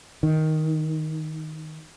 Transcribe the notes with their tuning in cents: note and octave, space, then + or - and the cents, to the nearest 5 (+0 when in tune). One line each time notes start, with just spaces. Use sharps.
D#3 +10